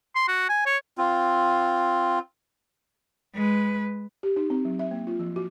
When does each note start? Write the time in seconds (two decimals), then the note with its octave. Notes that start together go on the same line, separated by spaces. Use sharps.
0.16 C6
0.28 F#4
0.49 G#5
0.66 C#5
0.98 C4 F4
3.35 G#3 B4
4.23 G4
4.36 D#4
4.50 C4
4.65 F#3
4.79 E5
4.91 A#3
5.07 F4
5.20 F3
5.36 F#4